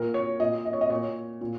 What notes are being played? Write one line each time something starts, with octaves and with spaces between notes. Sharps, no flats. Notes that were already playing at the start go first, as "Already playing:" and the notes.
Already playing: A#2 A#4
C#5
A#2 D#5
D#5
C#5
D#5
A#2 C#5
A#2